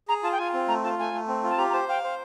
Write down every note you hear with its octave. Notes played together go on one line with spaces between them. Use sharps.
G#4 A#5
F4 A5
G5
F4 G#5
C4
A3 A#5
F4 A5
A3 G#5
A3
C4
F4
A5
G4 A#5
A#5
C5 A5
F5 G5
C5